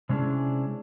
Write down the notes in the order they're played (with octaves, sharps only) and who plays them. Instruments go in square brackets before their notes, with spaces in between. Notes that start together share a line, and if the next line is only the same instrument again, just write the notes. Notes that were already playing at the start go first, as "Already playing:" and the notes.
[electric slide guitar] C3 G#3 C#4 D4 E4 G#4